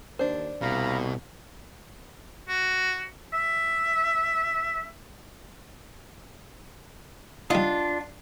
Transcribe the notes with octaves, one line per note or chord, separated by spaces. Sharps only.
D#2 D4 C5
C2 B2 F5 A#5 B5
F#4
E5
G3 D4 D#4 F4